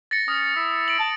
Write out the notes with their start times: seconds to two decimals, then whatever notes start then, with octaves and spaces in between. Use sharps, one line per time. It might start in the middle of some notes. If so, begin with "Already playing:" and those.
0.11 A6 A#6 C#7
0.28 C#4 D#6
0.56 E4
0.88 D7 F#7
0.99 A5